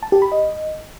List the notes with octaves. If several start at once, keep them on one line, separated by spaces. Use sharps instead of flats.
A5
G4
B5
D#5